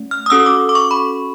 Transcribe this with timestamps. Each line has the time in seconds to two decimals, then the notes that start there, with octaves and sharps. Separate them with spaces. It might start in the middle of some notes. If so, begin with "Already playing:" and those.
Already playing: A3 C#4
0.11 F6
0.26 D#6
0.30 C#4 F#4 A4 E6
0.46 D6
0.69 D6
0.75 C#6
0.91 B5